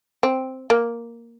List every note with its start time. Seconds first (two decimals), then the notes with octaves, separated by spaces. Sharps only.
0.23 C4
0.70 A#3